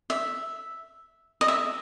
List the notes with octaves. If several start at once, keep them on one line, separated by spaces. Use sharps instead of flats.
E5
D#5
E5